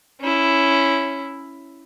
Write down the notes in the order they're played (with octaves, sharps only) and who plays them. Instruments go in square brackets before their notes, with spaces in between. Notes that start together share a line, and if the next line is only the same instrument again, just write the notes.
[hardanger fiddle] C#4 E4